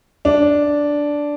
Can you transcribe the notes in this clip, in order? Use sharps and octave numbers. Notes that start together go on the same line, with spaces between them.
D4